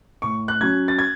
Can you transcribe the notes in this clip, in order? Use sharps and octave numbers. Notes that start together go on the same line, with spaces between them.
A2 C#6
F#6
F#3 C#4 G#6
A6
G#6